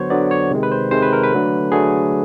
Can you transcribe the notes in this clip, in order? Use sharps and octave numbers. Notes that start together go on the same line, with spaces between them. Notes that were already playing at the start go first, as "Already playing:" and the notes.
Already playing: D3 F#3 B3 C5 C#5
D3 F#3 B3 D5
C#5
C3 D#3 G#3
B4
C5
C3 D#3 G#3 C5
B4
A#4
B4
D3 F#3 A3
D3 F#3 A3 G#4